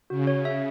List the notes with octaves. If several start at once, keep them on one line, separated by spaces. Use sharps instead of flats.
C#3 F#4
C#5
E5